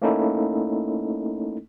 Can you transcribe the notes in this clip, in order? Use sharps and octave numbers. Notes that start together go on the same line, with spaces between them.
A3 A#3 C#4 D#4 E4 A4